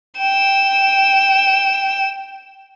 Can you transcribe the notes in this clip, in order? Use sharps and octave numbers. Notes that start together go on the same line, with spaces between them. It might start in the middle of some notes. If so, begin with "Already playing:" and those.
G5 E7